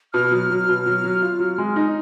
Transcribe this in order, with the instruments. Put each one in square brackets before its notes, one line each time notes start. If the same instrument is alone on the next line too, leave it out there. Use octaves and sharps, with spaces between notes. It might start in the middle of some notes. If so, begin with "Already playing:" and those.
[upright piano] B2 [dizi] F6
[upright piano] F#3
F#3
B2
F#3
F#3
F4
F#3
G#3
D#4